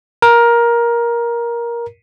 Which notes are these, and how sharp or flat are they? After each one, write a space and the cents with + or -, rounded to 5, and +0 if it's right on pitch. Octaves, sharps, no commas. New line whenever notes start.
A#4 +15